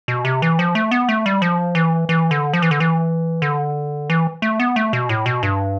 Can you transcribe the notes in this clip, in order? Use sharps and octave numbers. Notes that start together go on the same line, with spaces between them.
B2
C3
E3
F3
A3
B3
A3
G3
F3
E3
E3
D3
F3
E3
D3
E3
D3
E3
A3
B3
A3
B2
A2
B2
G2